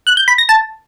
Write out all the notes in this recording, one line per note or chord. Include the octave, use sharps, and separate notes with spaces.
F#6
G6
B5
A#6
A5